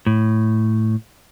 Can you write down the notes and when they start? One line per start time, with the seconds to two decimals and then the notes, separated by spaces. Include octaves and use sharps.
0.07 A2